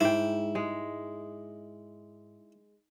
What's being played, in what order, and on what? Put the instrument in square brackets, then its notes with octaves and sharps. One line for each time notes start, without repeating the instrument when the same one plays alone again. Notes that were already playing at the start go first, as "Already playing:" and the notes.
[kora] G#2 G5 [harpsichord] E4
[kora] G#3